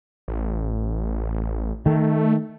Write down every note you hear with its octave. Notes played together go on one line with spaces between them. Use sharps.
A1
D#3 A3